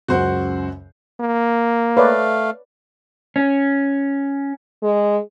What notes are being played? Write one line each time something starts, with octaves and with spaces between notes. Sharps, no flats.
C#2 F#2 F#4 C5 F#5
A#3
A3 B4 C#5 D5 F5
C#4
G#3